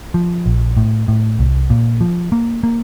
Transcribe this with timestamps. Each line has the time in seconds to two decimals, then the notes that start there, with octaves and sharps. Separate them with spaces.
0.14 F3
0.46 A#1
0.77 A2
1.08 A2
1.39 C2
1.70 A#2
2.01 F3
2.32 A#3
2.63 A#3